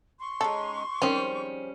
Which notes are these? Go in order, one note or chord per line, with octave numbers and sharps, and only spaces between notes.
C6 C#6
G#3 C#4 D#4 A4
D#3 F3 G3 C4 C#4 G#4 C5